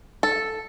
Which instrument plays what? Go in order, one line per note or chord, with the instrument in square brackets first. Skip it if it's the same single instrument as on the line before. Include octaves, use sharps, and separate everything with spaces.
[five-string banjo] A4